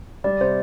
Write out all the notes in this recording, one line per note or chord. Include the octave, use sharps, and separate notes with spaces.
G3 D5
C3 C5